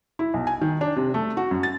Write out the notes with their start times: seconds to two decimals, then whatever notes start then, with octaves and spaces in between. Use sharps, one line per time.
0.19 E4
0.34 B1
0.47 G#5
0.61 D#3
0.81 D4
0.96 C3
1.14 A3
1.37 F#4
1.51 F#2
1.63 A6